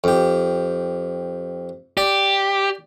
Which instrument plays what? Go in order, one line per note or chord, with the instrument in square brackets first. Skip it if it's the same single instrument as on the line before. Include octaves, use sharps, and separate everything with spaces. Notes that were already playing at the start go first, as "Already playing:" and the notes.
[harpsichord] F2 G4
[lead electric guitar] G4 [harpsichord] D5